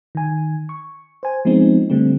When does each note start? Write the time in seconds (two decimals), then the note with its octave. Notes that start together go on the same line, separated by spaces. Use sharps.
0.15 D#3 G#5
0.69 C#6
1.23 C5 G#5
1.45 F3 G#3 B3 C4 D#4
1.90 D3 G3 A3 C4